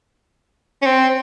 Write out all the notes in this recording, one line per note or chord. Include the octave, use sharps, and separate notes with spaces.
C#4
C4